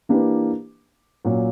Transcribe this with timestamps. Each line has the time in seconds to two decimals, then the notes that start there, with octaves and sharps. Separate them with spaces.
0.09 E3 A#3 D4 G4 B4
1.24 A#2 F#3 C#4